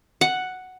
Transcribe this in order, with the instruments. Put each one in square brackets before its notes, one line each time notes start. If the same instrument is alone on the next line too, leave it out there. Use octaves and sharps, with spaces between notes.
[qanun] F#5